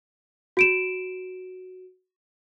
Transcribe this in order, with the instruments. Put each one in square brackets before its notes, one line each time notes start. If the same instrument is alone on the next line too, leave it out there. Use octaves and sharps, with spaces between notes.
[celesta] F#4 D7 E7